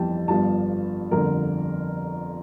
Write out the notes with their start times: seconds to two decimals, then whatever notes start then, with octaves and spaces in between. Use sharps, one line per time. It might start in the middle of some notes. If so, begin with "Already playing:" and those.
Already playing: G1 F2 E3 G3 G5 A5
0.28 G1 G2 F3 A5
1.11 G1 F2 D3 A#4